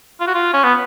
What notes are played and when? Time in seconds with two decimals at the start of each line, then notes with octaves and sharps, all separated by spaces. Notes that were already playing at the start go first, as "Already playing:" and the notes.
0.20 F4
0.27 F#4
0.34 F4
0.54 C#4
0.64 B3